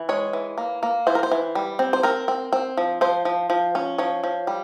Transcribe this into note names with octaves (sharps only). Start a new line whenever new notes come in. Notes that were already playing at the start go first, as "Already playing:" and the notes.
Already playing: E3
G#3 C#5
E3
A#3
A#3
E3 C5
A#4
C5
E3
G3
C4
C5
C4 A#4
C4
C4
F3
F3 C5
F3
F3
C#4
F3 C#5
F3
G3